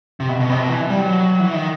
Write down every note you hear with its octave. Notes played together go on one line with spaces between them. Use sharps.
C3
B2
B2
C3
B2
E3
G3
F#3
E3
D#3